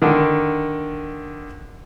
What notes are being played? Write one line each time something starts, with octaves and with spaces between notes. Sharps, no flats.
D3 D#3